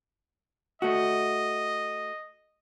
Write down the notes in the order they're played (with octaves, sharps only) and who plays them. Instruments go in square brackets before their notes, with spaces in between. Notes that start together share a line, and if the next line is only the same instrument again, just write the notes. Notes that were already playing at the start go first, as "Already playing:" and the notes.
[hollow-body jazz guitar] A3 F#4 [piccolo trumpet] D#5